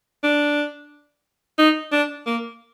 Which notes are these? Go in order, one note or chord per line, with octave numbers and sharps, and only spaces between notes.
D4
D#4
D4
A#3